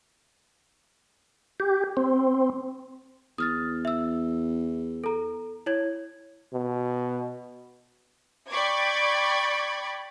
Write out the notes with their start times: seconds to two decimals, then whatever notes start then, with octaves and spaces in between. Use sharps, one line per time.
1.60 G4
1.97 C4
3.38 E2 D#6 F6 A6
3.85 E5 E6
5.04 A4 A#5
5.66 E4 C#5 G#6
6.53 B2
8.50 D5 G5 B5 C#6 D6 G#6